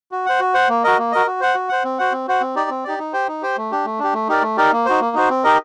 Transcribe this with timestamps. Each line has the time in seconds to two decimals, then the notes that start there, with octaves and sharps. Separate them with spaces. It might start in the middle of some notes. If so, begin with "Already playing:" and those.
0.12 F#4
0.26 C5 F#5
0.40 F#4
0.54 C5 F#5
0.69 A#3
0.84 F#4 A#4 D#5
0.98 A#3
1.12 F#4 A#4 D#5
1.26 F#4
1.40 C5 F#5
1.55 F#4
1.69 C5 F#5
1.84 C4
1.99 F#4 C5 F#5
2.12 C4
2.28 F#4 C5 F#5
2.41 C4
2.55 D#4 G4 D5
2.70 C4
2.84 D#4 G4 D5
2.99 D#4
3.13 G4 C5 G5
3.28 D#4
3.42 G4 C5 G5
3.57 A3
3.72 D4 G4
3.85 A3
3.99 D4 G4
4.14 A3
4.29 D#4 G4 A#4 D5
4.42 A3
4.57 D#4 G4 A#4 D5
4.72 A#3
4.85 D#4 F#4 C5
5.00 A#3
5.14 D#4 F#4 C5
5.29 C4
5.44 D#4 G4 A#4 D#5